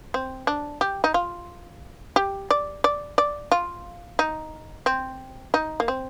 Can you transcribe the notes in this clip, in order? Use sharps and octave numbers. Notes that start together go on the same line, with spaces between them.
C4
D4
G4
D#4
F4
G4
D5
D5
D5
F4
D#4
C4
D#4
A#3
C4